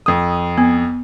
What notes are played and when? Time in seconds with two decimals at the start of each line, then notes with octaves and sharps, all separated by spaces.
0.06 F2 D#6
0.58 B3